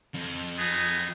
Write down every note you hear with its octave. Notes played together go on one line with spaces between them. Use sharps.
F2
B3 D#4 G#4